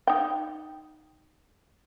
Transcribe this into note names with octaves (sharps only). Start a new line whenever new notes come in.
D#4 G5